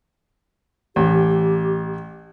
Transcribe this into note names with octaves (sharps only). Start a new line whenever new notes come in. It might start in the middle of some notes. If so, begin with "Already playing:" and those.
A1 G4